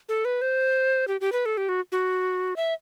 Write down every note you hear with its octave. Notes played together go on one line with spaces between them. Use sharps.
A4
B4
C5
G4
G4
B4
A4
G4
F#4
F#4
E5